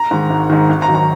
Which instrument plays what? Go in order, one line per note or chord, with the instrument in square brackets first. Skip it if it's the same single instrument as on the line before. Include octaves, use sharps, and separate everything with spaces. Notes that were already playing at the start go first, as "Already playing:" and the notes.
Already playing: [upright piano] A#5
G#2 D#3
G#1
G#2 D#3
G#1
A#5
D#3 F#3
A#5